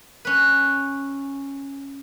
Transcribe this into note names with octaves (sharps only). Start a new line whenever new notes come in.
C#4 B4